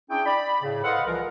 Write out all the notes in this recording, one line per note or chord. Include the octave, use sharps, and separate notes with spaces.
C#4 D4 E4 G#4 G5
D5 B5
A2 C#3
A4 B4 C5 D#5 F5 F#5
C2 E3 F3 F4 A#4